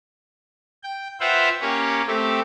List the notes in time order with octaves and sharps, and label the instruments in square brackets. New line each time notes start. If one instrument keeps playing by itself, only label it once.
[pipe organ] G5
F4 B4 C5 E5 F#5 G5
A#3 C#4 G4 C#5
A3 C4 G4 A4